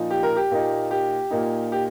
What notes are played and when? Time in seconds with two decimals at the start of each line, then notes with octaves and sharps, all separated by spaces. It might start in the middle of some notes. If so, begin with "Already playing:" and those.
Already playing: A#2 F3 D#4
0.11 G4
0.23 A#4
0.37 G4
0.51 A#2 A#3 D#4
0.91 G4
1.31 A#2 A#3 D#4
1.72 G4